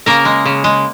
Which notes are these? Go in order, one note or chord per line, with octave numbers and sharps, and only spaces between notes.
C#3 A#3 A#4
G#3
C#3
G#3